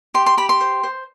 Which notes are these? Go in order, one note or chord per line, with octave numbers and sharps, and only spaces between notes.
G4 C6
C6
G4 B5
C6
C5
C5